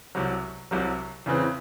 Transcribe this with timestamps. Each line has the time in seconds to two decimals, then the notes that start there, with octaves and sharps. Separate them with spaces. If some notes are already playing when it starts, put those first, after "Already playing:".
0.15 C2 C3 F#3
0.71 C2 C3 F#3
1.26 E2 C#3 E3 C4